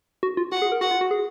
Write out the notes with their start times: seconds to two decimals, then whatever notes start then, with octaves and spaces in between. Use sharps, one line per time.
0.23 F#4
0.37 F4
0.52 F#4 F#5
0.62 G#4
0.72 A#4
0.81 F#4 F#5
0.91 F4
1.01 F#4
1.11 G#4